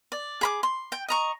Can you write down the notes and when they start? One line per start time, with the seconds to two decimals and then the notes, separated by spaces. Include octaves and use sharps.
0.12 D5
0.41 G#4 B5 D6
0.63 C6
0.92 G5
1.08 D#5 A#5 C#6